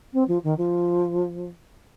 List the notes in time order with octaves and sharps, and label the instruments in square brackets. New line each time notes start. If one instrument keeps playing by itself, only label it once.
[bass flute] C4
F3
D#3
F3